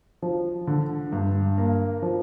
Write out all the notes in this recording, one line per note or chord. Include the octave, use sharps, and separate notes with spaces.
F3
D3
G2
A#3
F3